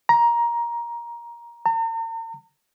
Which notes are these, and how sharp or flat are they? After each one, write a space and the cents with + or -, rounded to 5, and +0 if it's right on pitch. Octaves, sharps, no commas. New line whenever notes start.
A#5 +15
A#5 -45